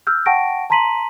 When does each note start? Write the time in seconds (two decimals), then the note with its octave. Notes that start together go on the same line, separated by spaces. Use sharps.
0.07 E6 F6 G6
0.26 F#5 G5 A5 C#6 A#6 D7
0.70 A5 A#5 C6 B6 D#7 F#7